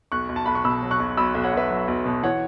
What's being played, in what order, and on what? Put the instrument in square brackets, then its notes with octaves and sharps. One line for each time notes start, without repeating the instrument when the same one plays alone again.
[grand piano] B1 C#6 F#6
B1
A5
B1 B5
C#6
B2 B5 E6
F#3
C#6 F#6
B1
B1 B5 E6
B1
C#5 F#5
B1 B4 E5
F#3
B1
B2
E3 C#5 F#5